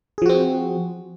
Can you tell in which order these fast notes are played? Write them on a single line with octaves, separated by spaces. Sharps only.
G#4 F3 F#4 C4